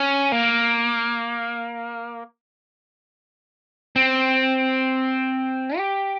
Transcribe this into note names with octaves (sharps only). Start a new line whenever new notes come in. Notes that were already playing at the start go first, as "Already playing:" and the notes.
Already playing: C#4
A#3
C4
G4